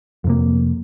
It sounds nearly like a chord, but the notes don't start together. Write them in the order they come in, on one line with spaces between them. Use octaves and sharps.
F2 C3 A#3